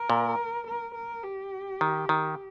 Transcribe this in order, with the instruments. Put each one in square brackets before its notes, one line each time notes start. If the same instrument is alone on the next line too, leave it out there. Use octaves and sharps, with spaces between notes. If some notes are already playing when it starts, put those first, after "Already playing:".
Already playing: [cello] A#4
[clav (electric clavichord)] A#2
[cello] A#4
A#4
G4
[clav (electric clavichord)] D#3
D#3